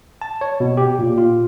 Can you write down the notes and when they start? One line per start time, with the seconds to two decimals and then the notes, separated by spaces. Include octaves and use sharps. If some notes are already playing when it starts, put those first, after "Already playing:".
0.21 A5
0.41 C#5
0.60 B2
0.77 G4
0.99 A#2
1.18 F4